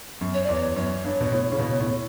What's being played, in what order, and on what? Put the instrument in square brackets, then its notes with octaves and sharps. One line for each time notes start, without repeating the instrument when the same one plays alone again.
[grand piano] F#2
[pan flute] C#5
[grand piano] E2 [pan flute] D5
[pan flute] C#5
[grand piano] F#2 [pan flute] C#5
[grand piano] G2
B2
A2
C#3
B2
A2